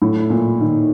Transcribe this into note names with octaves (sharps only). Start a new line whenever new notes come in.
A2
A#2
D#3